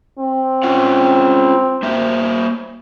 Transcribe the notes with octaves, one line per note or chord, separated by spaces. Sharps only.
C4
C#4 F4 F#5
A#3 C5 E5